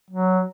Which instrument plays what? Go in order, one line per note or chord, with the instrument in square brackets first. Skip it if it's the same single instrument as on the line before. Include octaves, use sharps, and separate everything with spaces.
[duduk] F#3